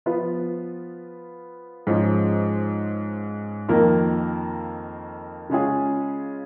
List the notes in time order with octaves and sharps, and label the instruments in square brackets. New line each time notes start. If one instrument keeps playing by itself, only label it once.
[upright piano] F3 B3 F4 B4
G#2 F3 G#3 C#4
F2 D#3 A#3 F4 A#4
C#3 G#3 C#4 F4 G#4